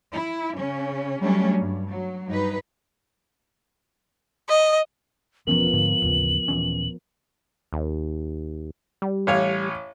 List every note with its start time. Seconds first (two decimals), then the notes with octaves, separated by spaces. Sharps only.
0.12 E4
0.57 C#3 C#4
1.21 F#3 G3 A3 C#4 D4
1.60 G2
1.90 F#3
2.27 G2 D#4 B4
4.49 D#5
5.47 E1 E2 F3 B3 C#4 A#4 F#7
5.73 G#2 D3
6.02 A1 D#2 C#3
6.48 D#1 E3 C#4
7.73 D#2
9.02 G3
9.27 A1 C#5 F5